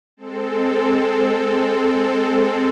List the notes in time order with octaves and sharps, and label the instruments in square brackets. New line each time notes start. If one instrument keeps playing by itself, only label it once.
[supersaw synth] G#3 C4 A4